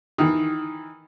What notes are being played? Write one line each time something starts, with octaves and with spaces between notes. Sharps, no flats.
D#3 E3